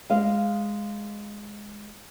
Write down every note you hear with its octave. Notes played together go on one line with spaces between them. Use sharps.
G#3 D#5 F5